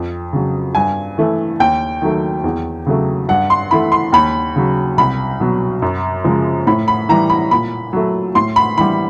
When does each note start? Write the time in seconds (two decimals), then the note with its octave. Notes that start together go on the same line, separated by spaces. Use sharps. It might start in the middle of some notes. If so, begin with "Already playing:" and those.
Already playing: F2
0.33 C#3 F#3
0.75 G2 G#5
1.18 E3 A3
1.60 D#2 G5
2.02 D#3 F#3 A3
2.44 E2
2.86 C#3 F#3 A3
3.29 G2 F#5
3.50 C6
3.71 E3 A3 B5
3.92 C6
4.13 D#2 B5
4.56 C#3 F#3
4.98 C2 B5
5.40 B2 F#3
5.82 F#2
6.24 C#3 F3 G#3
6.67 A2 B5
6.88 B5
7.09 E3 G3 A#5
7.30 B5
7.51 A#2 B5
7.93 F#3 A3
8.35 A2 C6
8.56 B5
8.77 E3 G3 B5